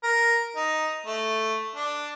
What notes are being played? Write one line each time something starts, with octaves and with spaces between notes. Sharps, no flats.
A#4
D#4
A3
D4